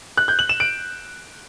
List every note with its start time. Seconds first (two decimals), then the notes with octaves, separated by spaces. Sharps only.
0.17 F#6
0.28 G6
0.39 F#7
0.49 E7
0.60 D7